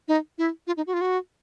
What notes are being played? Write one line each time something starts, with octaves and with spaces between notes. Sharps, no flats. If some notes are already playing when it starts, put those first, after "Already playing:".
D#4
E4
F4
D#4
F#4
F4
F#4